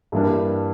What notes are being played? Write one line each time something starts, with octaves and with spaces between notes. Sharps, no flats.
G2 E3 G3 A#3 D4